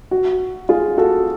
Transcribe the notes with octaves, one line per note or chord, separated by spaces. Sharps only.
F#4
F4 G#4
F#4 A4